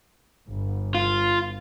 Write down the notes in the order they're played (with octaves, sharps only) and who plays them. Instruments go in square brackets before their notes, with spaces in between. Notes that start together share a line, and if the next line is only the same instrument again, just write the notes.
[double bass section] G1
[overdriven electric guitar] F4